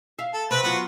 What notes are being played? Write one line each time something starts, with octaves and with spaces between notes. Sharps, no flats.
E5 F5
A4
C3 C4 B4
F#3 B3 F4 F#4 B4